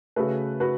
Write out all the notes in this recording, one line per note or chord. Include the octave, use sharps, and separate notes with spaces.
C#3 A3 F#4 B4
F#4 B4